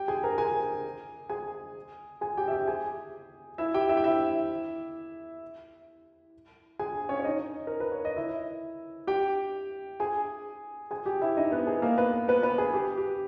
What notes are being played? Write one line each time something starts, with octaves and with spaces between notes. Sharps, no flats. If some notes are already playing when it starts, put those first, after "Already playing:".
Already playing: G4 G5
G#4 G#5
A#4 A#5
G#4 G#5
G#4 G#5
G#4 G#5
G4 G5
E5
G4 G5
G#4 G#5
E4 E5
G4 G5
E4 E5
G5
E4 E5
G#4 G#5
C#4 C#5
C#5
D#4 D#5
A#4
B4
C#5
D#5
E4 E5
G4 G5
G#4 G#5
G#4 G#5
G4 G5
E4 E5
D#4 D#5
B3 B4
G#4
A#3 A#4
B3 B4
B3 B4
B3 B4
G#4
G4
G4